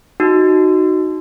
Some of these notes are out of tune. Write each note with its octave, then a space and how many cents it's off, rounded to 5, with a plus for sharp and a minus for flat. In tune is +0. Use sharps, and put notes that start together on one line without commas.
D#4 +0 F#4 +0